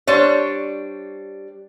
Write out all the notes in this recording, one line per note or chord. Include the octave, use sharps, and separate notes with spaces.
G3 D4 C5 C#5